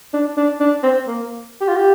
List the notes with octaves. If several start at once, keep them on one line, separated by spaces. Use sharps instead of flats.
D4
D4
D4
C4
A#3
G4
F4
G4